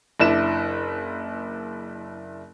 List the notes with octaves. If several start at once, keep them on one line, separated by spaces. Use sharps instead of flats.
F#1 D4 E4 E7